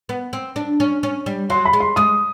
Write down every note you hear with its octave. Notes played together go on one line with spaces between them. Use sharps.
B3
C4
D4
C#4
C#4
G3
F#3 C6
B5
G#3
C6
G#3 D#6